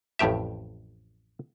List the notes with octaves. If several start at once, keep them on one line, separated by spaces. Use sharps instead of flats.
A1 F2 A2 G4 E5